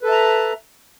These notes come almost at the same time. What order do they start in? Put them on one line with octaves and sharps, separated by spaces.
B4 A4 A5 E5 A#5